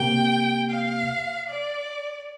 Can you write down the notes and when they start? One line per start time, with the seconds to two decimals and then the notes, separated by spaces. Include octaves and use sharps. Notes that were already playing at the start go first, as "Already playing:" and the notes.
Already playing: C3 A#3 G4 G5
0.70 F5
1.48 D5